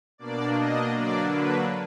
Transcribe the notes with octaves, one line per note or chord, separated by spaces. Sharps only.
B2 A#3 D4 D5
D#5
D3 F#3 A#3 D4 D5
B4